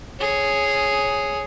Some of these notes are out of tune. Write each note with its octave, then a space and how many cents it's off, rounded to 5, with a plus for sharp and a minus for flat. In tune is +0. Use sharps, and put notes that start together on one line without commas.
G#4 +0 C#5 +0